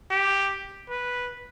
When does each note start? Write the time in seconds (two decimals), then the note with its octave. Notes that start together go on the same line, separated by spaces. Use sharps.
0.10 G4
0.89 B4